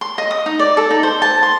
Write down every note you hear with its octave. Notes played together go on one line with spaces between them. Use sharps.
C6
D#5
D#6
D#4
D5
A4
D#4
C5
A5
C6